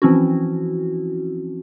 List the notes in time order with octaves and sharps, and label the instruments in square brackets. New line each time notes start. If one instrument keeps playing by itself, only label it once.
[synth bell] E3 F3 C4 C#4 E4 F#4